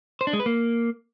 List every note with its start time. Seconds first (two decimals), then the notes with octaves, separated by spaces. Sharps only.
0.21 C5
0.27 D4
0.33 G#3
0.40 B4
0.46 A#3